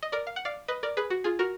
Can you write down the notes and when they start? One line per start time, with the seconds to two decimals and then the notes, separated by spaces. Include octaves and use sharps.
0.03 D#5
0.12 A#4 D5
0.27 F5
0.36 F#5
0.45 D5 F5
0.68 B4 D#5
0.83 A#4 D5
0.97 G#4 B4
1.10 F#4
1.24 F4 G#4
1.39 F#4 A#4